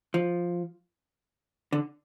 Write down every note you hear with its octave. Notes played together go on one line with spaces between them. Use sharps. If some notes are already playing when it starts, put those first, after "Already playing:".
F3
D3